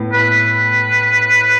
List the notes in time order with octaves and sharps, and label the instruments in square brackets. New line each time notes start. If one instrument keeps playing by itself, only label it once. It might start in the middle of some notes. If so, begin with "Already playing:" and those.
Already playing: [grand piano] A2 B3
[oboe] B4